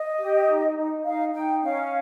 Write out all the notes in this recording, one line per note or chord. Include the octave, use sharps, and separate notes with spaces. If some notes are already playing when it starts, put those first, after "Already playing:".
Already playing: D#5
G4
D#4
D#4
D#4 F5
D#4 G5
C#4 F5